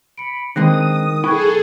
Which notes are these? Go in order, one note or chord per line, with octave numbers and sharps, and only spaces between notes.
B5 C#7 D7
D3 D#3 G#3 C4 G5 D#6 F#6 A#6
B1 E4 G#4 A4 G5 C#6 F#6 G#6